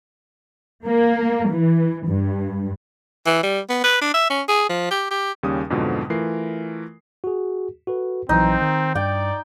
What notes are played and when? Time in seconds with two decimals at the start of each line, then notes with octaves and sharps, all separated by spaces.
0.85 A#3
1.51 E3
2.08 G2
3.26 E3
3.43 G3
3.69 B3
3.84 B4
4.01 D4
4.14 E5
4.30 C#4
4.48 G#4
4.69 F3
4.91 G4
5.11 G4
5.43 D#2 C#3 G3 C#4 G4 D#6
5.70 F2 G#2 B2 D3 F3 F#3
6.10 E3 A3 F4 A#4 C7
7.24 F#4 G#4
7.87 F#4 A4 B4
8.29 A#1 E3 F#3 C4 D#4
8.61 D#3
8.95 G2 D5 G5